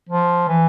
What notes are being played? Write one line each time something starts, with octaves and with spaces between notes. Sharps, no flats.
F3
E3